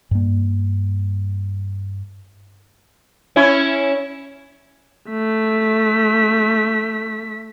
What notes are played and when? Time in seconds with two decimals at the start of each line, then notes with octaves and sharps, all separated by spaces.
0.11 G2 A#3
3.36 C#4 E4
5.10 A3 B6